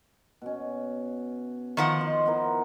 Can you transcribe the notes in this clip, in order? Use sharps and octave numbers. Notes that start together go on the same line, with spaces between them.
B2 C#4
D#3 F3 F#5
C5 D#5
B3 E4 A#4